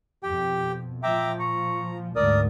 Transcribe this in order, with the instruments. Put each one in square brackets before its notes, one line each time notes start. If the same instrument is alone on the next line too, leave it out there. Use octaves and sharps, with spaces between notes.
[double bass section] F2 B2 [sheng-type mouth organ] G4 G5
[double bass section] A#2 F3 [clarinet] E5 [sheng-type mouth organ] G5 A#5 D6
[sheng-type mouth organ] A#5 [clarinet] C#6
[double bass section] D2 G#2 [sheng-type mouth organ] A#4 D#6 [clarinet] D5